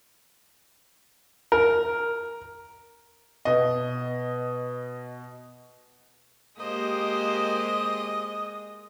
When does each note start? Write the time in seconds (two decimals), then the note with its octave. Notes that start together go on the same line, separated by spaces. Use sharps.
1.52 A#4
3.45 B2 D#5
6.60 G#3 A#3 G4 C5 D#5 D#6